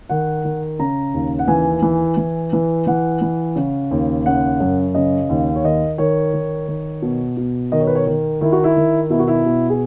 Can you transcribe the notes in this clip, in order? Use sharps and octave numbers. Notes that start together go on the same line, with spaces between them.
D#3 F#5
D#3
C#3 A#5
D#2
F#5
E3 G#5
E3
E3
E3
E3 F#5
E3
C#3
D#2
C#3 F#5
F#2
C#3 D#5
D#2
C#5
D#3 D#5
D#3 C#5
D#3
D#3
B2
B2
D#3 D#5
C#5
B4
C#5
D#3
D#3 E4
F#4
E4
D#3
B2 E4
F#4
E4
B2
G#4